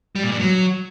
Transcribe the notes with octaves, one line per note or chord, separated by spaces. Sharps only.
G3
A#2
G2
F#3